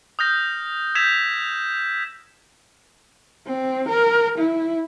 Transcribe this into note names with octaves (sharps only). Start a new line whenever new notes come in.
D#6 F6 G6 A#6
E6 G6 G#6 B6 E7 F7
C4
A#4
E4